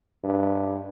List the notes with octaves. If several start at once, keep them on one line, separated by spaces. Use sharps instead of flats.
G2